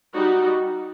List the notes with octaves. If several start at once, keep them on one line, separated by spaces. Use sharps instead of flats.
G3 D#4 F#4